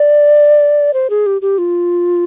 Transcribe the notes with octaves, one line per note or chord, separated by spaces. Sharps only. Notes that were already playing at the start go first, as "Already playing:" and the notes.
Already playing: D5
C5
G#4
G4
G4
F4